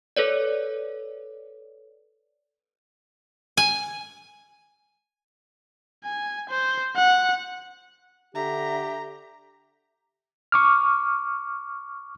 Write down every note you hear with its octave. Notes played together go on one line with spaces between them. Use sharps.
A4 B4 C#5 D5
G#5
G#5
C5
F#5
D3 G4 E5 A#5
C#6 D6 F6